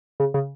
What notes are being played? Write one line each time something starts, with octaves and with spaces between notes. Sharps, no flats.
C#3
C#3